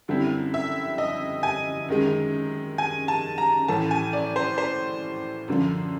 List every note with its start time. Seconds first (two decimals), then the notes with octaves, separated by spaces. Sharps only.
0.08 F#2 D3 G3 C4 E4
0.54 E5
0.98 D#5
1.43 G#5
1.88 F#2 D#3 G#3
2.78 G#5
3.08 A5
3.38 A#5
3.68 A2 E3 A3 C#4 A5
3.91 G#5
4.13 D5
4.36 C5
4.58 C5
5.48 F#2 D3 F3